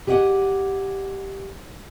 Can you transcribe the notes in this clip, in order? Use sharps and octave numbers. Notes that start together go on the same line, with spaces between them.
G4 G#4 D#5 F5 F#5